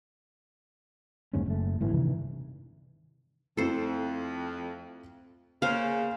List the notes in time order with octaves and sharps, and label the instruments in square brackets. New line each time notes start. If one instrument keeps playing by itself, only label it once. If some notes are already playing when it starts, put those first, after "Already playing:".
[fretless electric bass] F#1 D#2 G#2 C#4
F#1 A3
G1 A2 E3
G2 C3 D#3 E3
[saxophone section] F2 [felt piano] A3 C4 E4 [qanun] A4 C5
[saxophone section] C#3 [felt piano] A#3 [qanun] C5 F5